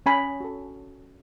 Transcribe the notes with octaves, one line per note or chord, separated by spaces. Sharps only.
C#4 G#5 B5
F#4 A4